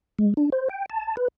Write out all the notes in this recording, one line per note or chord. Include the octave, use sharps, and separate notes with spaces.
G#3
D4
C5
G5
A5
B4